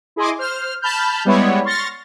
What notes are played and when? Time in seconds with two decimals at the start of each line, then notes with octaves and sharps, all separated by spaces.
0.16 E4 G#4 D#5 G#5 C6 D6
0.39 C5 F6
0.82 A5 B5 F6 G6
1.25 G3 G#3 B3 E4 C#5
1.65 C6 C#6 F6 A6 A#6